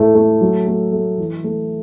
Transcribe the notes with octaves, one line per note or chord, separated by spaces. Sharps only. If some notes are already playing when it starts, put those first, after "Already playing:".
Already playing: A2 A3
A3
F#3
A3
A3
E3
A3